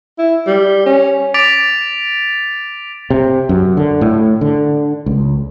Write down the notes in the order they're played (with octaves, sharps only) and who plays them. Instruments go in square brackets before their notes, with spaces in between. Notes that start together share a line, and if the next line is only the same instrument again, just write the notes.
[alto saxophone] E4
G3
C#4
[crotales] D6 A6 B6 D7 F7
[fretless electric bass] C3
F#2
D3
A2
D3
C#2